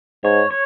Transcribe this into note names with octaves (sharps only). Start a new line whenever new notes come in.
G#2 C#5
C#5